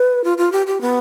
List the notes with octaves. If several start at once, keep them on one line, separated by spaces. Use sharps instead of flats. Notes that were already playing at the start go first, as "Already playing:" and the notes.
Already playing: B4
F4
F4
G4
G4
B3